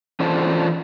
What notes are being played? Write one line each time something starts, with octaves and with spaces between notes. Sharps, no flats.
E3 C#4 D4 F4 A4 C5